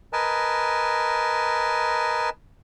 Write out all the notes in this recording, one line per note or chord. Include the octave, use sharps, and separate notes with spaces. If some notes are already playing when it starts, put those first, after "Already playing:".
A#4 B4 D#5 G#5 A5